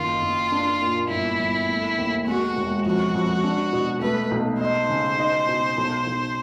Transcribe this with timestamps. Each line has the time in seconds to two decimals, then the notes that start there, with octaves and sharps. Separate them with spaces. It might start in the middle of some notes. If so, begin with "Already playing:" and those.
Already playing: F#1 D#3 F4
0.22 F#1
0.52 D4
0.82 A#2
1.10 G1 E4
1.40 G1
1.69 A3
1.98 D#2
2.27 G#3 F#4
2.56 E1
2.86 F2 F#4
3.15 F2
3.44 D4
3.73 B2
4.01 A3 B4
4.31 B1
4.60 D#4 C5
4.89 C#3
5.19 D#4
5.48 B2
5.78 B1
6.07 B1